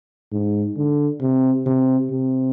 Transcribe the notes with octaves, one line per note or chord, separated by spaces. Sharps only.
G#2
D3
C3
C3
C3